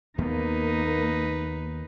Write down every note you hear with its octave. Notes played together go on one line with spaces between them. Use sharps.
D#2 A#3 B3 D#4 B4